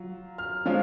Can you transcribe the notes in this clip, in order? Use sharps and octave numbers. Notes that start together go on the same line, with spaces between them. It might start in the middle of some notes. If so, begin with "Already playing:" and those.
Already playing: F#3 F4
F6
F3 G#3 C#4 F4